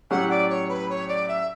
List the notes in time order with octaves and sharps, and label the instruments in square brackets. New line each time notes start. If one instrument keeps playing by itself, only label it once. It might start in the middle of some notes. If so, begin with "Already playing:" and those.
[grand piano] A2 F#3 C#4 G4 [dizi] F#5
[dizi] D5
C#5
B4
C#5
D5
E5